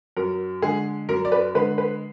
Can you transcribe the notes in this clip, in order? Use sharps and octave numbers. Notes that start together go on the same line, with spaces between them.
F#2 A#4
D3 G#3 G#4
F#2 A#4
D5
B4
D3 G#3 B4
B4